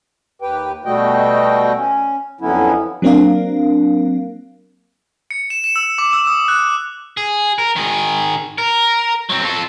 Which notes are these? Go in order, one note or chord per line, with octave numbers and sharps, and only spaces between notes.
D#2 G4 B4 G5
B2 G3 A3 F#4 D#5 G5
C#4
F2 D3 F#3 B3 C#4 E4
F#3 A#3 C4 D4 A#4 F5
C#7
E7
E7
E6
D6
E6
D#6
F#6
G#4
A#4
D#3 G#4
A#4
F#3 C4
F4 A4